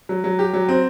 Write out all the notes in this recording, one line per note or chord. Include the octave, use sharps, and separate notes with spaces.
F#3
F#3
G4
F#3
C4